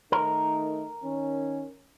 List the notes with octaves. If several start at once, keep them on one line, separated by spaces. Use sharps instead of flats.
D#3 A3 D#4 A#4
D#3 C#4